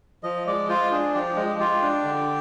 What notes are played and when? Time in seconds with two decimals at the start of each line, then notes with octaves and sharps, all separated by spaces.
0.23 F3 D#5
0.47 G#3 D5
0.69 F4 C5
0.91 D4 G#4
1.14 F3 G4
1.36 G#3
1.59 F4 G4
1.82 D4
2.04 D3